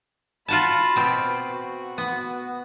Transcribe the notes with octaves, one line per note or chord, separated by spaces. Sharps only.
F4 F#4 A5 B5
B2 C4
F#4
B3